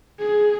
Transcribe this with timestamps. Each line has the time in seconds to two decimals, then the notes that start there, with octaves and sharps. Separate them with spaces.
0.19 G#4